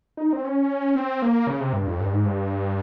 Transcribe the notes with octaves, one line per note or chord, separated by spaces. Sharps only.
D#4
C4
C#4
C4
A#3
C#3
C3
G2
F2
G2
G#2
G2